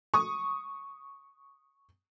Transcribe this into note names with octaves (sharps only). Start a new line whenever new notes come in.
C#6 D#6